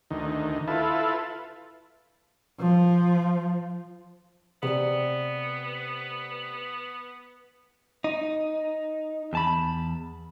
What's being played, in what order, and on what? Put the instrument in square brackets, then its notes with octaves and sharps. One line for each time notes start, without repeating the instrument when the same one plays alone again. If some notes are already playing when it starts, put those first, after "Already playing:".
[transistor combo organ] D2 D#3
E4 F4 A4 B4
[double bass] F3
[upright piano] C3 [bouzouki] G3 A3 [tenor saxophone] B3
[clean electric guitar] D#4
E2 A5 B5